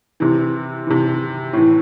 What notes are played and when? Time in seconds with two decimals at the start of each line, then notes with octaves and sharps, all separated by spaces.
0.20 C3 E3
0.87 C3 E3
1.53 A2 E3